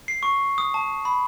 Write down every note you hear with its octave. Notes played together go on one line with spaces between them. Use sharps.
C7
C#6
D#6
A5
B5